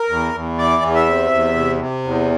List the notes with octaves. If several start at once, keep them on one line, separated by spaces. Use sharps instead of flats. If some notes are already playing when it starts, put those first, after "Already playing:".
Already playing: A#4
E2
E2
E3 D5
E2
E5
C3
E2
C3
C3
E2